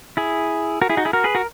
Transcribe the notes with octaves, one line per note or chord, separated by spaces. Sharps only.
E4 G#4
F#4 A#4
E4 G#4
D#4 F#4
E4 G#4
F#4 A#4
G#4 B4
F#4 A#4